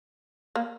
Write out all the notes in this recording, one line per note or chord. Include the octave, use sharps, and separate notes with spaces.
A#3